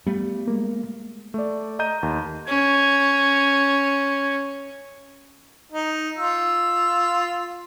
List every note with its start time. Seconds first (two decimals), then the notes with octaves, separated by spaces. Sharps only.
0.07 G3 A3 B3
0.48 G#3 A#3
1.34 A3 D5
1.79 D#5 A#5 G6 D#7
2.03 D#2
2.48 C#4 G#6
5.72 D#4
6.17 F4 E6